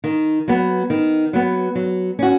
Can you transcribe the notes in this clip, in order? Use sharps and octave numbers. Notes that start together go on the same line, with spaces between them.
D#3
F#3 B3
D#3
F#3 B3
F#3
C#4 F#4